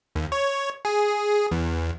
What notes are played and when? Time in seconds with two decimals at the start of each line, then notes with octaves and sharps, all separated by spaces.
0.15 D#2
0.32 C#5
0.85 G#4
1.52 E2